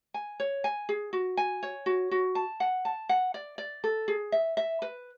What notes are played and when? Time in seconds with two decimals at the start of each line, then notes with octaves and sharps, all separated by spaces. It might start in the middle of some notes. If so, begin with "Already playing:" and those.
0.14 G#5
0.40 C#5
0.64 G#5
0.89 G#4
1.13 F#4
1.37 G#5
1.63 C#5
1.86 F#4
2.11 F#4
2.35 A5
2.60 F#5
2.85 A5
3.09 F#5
3.34 D5
3.58 D5
3.84 A4
4.08 G#4
4.32 E5
4.57 E5
4.82 B4